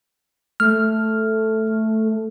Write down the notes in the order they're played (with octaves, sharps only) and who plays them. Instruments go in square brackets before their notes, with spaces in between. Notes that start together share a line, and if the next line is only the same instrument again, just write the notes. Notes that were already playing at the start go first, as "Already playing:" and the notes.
[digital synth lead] A3 [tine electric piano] F6